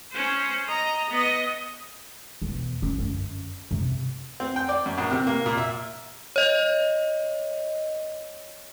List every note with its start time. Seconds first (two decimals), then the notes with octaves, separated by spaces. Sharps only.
0.11 C#4 C5
0.68 D#5 A#5
1.10 B3 D#5
2.42 E2 B2
2.82 C#4
2.98 F#2 D3
3.71 F2 C3
4.40 C4
4.56 G5
4.69 D5
4.86 F#2
4.98 A#1
5.11 C3
5.27 A#3
5.46 A#2
5.57 E5
6.36 C#5 D#5